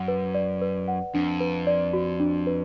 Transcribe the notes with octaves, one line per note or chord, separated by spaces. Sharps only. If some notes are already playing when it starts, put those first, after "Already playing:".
Already playing: F#2 F#5
B4
D5
B4
F#5
F2 D4
B4
D5
F#4
D4
B4